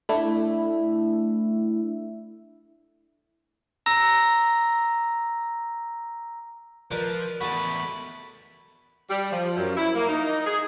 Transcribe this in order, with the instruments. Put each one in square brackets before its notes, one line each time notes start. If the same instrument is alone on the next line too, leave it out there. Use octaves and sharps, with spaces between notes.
[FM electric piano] A3 D4 E4 E5
[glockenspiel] A#5 E6 A#6
[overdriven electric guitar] F3 [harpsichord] A#4 D5 D#5 [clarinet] B4
[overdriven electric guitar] E2 A3 [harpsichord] F#4 D#5 A5 [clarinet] B5
[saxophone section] G3
F3
F#2
E4
A#3
D#4
G#4